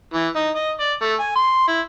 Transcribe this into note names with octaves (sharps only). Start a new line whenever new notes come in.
E3
D#4
D#5
D5
A3
G#5
C6
E4